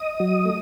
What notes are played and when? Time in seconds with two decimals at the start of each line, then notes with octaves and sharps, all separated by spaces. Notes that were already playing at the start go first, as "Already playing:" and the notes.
Already playing: D#5 D#6
0.20 F#3
0.45 A3